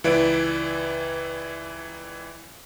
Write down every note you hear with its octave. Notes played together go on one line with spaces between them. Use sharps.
C#2 E3 E4 B4 D5 D7